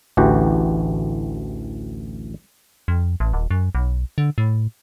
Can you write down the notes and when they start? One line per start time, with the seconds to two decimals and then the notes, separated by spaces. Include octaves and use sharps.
0.17 A1 D2 E3 F#4 G4
2.88 F2
3.20 A1
3.33 D#1
3.51 F#2
3.75 B1
4.18 D3
4.38 A2